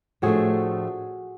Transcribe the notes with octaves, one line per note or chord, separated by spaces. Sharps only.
A2 F3 A3 D4 F#4 G#4